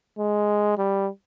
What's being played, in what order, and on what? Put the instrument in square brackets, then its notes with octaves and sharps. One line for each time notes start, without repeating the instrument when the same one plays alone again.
[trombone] G#3
G3